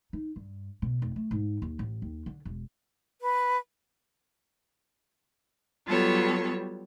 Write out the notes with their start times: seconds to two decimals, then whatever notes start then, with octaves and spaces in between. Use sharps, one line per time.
0.13 D#4
0.36 G2
0.82 B2
1.02 F1
1.16 A3
1.31 G#2
1.62 D#2
1.79 A1
2.02 D#2
2.26 D3
2.45 E1
3.21 B4
5.86 F#3 G3 B3 F4 A4 C#5